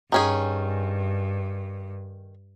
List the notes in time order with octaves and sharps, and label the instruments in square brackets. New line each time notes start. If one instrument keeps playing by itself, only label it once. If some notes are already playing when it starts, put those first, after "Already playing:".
[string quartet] G2 [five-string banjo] D#3 C#4 G#4